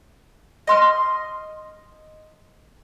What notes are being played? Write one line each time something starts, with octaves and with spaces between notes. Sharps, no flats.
D#5 C6 F6